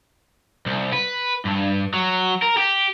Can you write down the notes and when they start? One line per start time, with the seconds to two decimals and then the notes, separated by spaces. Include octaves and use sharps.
0.66 C2
0.93 B4
1.45 G2
1.93 F#3
2.42 A#4
2.57 G4